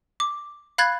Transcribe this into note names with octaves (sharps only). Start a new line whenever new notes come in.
D6
F5 B5 F#6 G#6 A6